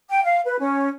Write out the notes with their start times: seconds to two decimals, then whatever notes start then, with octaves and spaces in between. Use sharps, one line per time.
0.09 G5
0.24 F5
0.45 B4
0.60 C#4